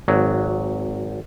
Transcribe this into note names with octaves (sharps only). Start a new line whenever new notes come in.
G#1 F#3